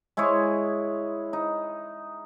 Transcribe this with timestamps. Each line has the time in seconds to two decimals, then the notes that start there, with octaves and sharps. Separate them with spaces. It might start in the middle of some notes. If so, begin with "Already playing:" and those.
0.17 G#3 E4 G#4 C#5
1.33 D#4